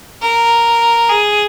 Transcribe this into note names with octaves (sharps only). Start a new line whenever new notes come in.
A#4
G#4